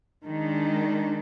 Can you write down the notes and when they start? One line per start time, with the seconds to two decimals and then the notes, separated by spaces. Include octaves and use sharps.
0.25 D#3 G#3 D4